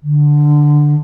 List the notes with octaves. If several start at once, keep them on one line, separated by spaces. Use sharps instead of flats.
D3